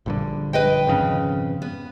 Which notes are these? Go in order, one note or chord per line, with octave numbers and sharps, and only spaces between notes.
A#1 G2 D3
B4 D#5 G5
G#1 F2 C#3
B3